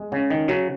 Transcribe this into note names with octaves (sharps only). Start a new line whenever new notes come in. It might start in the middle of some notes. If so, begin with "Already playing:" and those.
Already playing: G#3
C#3 C#4
D#3 C#4
C#3 F#3 F#4